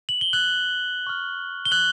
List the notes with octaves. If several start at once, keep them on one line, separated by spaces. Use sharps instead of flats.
F#7
G7
F#6 F#7
C#6 F6
G7
F#6 F#7